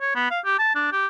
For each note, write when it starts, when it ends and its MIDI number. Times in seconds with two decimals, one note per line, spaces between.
0.01 0.12 73
0.15 0.30 59
0.31 0.40 77
0.45 0.59 67
0.59 0.75 81
0.75 0.88 62
0.92 1.07 67